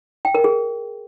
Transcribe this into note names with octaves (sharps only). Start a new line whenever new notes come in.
G5
A#4
G#4